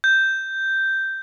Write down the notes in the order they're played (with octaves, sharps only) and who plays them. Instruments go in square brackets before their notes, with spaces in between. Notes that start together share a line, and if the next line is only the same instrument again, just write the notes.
[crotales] G6